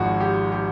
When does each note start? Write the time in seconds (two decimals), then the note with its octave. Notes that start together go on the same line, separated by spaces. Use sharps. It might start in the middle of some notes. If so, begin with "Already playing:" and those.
Already playing: G#1 G#2 F3 F#4
0.20 G4
0.52 G4